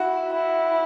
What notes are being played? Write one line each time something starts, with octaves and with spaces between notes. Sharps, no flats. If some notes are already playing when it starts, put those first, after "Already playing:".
Already playing: E4 F#4
E4